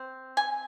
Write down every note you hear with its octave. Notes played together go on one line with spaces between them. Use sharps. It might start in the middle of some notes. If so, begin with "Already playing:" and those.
Already playing: C4
G#5